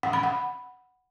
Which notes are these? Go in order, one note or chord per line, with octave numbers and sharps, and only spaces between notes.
F#5
B5
F#5